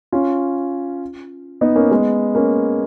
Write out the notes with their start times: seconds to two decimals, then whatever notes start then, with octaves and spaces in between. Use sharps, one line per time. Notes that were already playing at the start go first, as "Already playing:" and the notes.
0.12 C#4 F4
1.61 B3 D#4
1.75 A#3 C#4
1.91 G#3 B3
2.35 A#3 C#4